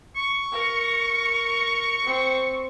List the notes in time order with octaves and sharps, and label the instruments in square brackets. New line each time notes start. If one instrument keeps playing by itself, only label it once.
[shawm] C#6
[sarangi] A#4
C4